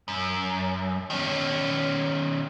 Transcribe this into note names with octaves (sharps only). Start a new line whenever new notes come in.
F#2
D#3 C#4